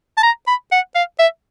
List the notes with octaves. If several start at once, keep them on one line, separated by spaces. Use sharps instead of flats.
A5
A#5
B5
F#5
F5
E5